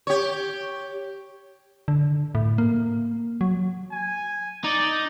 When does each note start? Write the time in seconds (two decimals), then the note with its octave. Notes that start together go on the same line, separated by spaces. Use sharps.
0.07 G4 C#5
1.88 D3
2.35 A2
2.58 A#3
3.41 F#3
3.91 G#5
4.64 D#4 D5